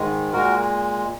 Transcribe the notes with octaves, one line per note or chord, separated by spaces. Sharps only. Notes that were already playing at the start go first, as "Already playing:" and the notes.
Already playing: G#2 D#3 G#3
A#2 G#3 F#4 A#4